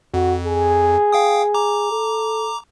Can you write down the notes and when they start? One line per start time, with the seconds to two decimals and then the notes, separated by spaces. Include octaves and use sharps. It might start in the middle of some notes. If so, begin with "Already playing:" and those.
0.14 F2 F#4
0.47 G#4
1.12 F5 G5 D#6
1.54 A#5 D6
1.92 A4